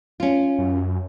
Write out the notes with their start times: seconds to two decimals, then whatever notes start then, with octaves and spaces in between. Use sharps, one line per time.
0.20 C#4 F4
0.58 F#2